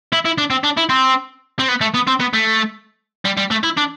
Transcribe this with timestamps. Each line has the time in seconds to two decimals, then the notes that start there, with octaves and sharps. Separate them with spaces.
0.12 E4
0.25 E4
0.38 D4
0.50 C4
0.64 D4
0.77 E4
0.90 C4
1.59 C4
1.68 B3
1.81 A3
1.94 B3
2.07 C4
2.20 B3
2.34 A3
3.25 G3
3.37 G3
3.51 A3
3.64 E4
3.78 D4